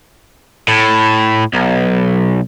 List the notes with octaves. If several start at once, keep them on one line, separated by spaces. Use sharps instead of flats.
A2
B1